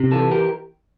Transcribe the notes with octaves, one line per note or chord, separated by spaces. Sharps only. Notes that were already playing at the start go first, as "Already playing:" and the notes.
Already playing: C3
E3 F4 A4
G4 A#4